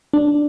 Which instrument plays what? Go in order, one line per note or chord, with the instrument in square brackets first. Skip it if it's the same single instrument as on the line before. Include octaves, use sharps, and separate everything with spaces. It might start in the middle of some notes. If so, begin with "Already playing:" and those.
[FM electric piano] D4